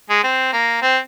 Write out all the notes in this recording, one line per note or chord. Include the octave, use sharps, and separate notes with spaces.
G#3
C4
A#3
C4